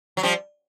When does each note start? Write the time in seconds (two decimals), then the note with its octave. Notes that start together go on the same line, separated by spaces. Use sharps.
0.17 F#3
0.23 F3 G3